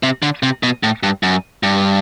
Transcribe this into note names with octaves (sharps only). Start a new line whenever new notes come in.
C3
D3
C3
B2
A2
G2
F#2
G2